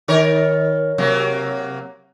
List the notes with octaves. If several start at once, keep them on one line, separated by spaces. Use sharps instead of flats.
D#3 A#4 C#5
C3 F#3 A#3